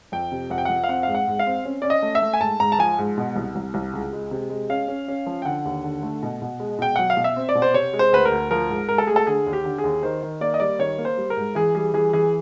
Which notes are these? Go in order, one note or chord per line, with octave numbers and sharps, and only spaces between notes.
F2 G5
C3
F2 F#5
G5
F2 F#5
F5
C4 F#5
G#2 F5
F#5
G#2
F5
C4
C#4
C#4 D5
D#5
A3
E5
A3
G#5
G#2 A5
G#2 A#5
A5
F3 G#5
G#2
B2
C2
C2
C2
C#2
G#3
C3
G#3
C#4 F5
C#4
C#4
F3
G5
D3 F#5
D#2
D3
A3
B2
B2
G#3
B2 G5
F#3 F#5
F5
B2
E5
C4
D5
B2
C5
C3 C#5
G#3
C5
D2 B4
A#4
D2
F3 A#4
G#2
G#2 A#4
A4
A3 G#4
A4
D3 G#4
D#2
G4
D3
G#4
D#2
D#3 C5
D#3
A#3 D5
D#5
G3 D5
D#3 C#5
A#3
C5
G3
A#4
G#2
E3 G#4
G3 G#4
E3 G#4
E3 G#4